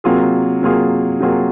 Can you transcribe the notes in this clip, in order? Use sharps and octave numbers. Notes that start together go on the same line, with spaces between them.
C3 F#3 A#3 F4 G#4
C3 F#3 A#3 F4 G#4
C3 F#3 A#3 F4 G#4